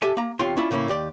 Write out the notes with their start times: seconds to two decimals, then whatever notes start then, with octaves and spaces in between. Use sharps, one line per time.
0.02 G4 A4 E5 G#5 A5
0.17 A#3 A#5
0.39 E2 C3 F4 C#5 G5 C6
0.57 C#4 D4 E4 F4 B5
0.71 A2 C#3 A#3 C#4 E4
0.88 D#2 G4 D5